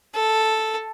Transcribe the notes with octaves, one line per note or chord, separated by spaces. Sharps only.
A4